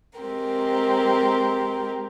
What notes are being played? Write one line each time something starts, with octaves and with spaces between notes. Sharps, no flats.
G#3 C4 G4 A#4